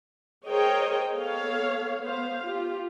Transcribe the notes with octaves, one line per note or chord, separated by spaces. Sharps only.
G#4 A#4 C5 C#5 D#5 G5
B3 A4 C#5 F5
B3 C5 F5
F4 G4